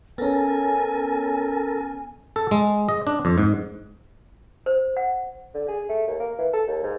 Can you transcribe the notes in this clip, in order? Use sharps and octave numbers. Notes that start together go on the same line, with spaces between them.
B3 C#4 A4 A#4 G#5
A4
G#3
D#5
D4
F2
G#2
C5
F#5
D3
G#4
A3
D#2
A#3
E3
A4
D#2
G#2